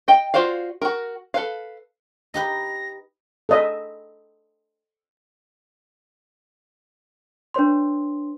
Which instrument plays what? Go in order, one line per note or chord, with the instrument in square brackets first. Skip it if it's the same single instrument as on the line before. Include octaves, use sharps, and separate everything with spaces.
[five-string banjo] D#5 G5
F4 F#4 C5 D5 F5
F#4 A#4
A4 B4 F5
[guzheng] D#4 G4 B4 [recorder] A#6
[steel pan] A4 D#5 E5
[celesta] D4 B4 C#5 C6